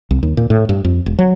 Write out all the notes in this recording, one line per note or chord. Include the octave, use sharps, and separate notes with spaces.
C2
D#2
A#2
A2
G2
F2
E1
F#3